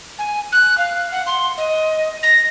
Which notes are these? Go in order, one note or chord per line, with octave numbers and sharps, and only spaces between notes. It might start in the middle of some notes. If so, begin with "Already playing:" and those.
G#5
F#6
F5
F#5
C6
D#5
A#6